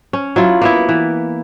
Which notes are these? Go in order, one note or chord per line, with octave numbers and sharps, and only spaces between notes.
C#4
F#3 E4 F4
A#3 B3 E4
E3